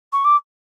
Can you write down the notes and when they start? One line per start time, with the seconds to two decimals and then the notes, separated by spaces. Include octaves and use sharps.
0.12 C#6
0.24 D6